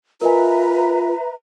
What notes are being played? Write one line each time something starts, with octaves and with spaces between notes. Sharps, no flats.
F4 A#4 B4 D#5 E5 G#5 A#5